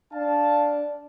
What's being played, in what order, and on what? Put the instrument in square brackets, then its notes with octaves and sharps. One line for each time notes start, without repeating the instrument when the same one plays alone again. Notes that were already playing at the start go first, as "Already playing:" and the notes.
[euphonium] D4 [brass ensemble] F5 A5